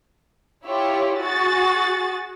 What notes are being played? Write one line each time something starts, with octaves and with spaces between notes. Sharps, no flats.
E4 F4 G4 C#5
F#4 G#4 A6